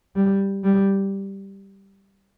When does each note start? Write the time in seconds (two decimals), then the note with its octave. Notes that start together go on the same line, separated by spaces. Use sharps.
0.16 G3
0.64 G3